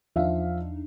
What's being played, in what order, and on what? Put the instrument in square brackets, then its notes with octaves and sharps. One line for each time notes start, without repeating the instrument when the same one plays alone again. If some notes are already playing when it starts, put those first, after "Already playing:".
[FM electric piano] E2 D4 D#4 [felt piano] F3 E5 F5